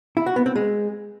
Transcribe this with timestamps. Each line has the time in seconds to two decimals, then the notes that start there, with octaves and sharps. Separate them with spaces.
0.17 E4
0.26 F#4
0.36 B3
0.46 C4
0.56 G#3